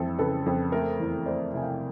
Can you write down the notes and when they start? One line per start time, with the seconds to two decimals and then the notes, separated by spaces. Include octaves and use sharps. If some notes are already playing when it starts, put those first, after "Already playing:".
Already playing: F2 E3 A4
0.18 C#3 A4 B4
0.46 F2
0.72 A3 A#4
1.00 E2
1.26 A3 C5 D5
1.53 C3 G#5
1.62 F5 G5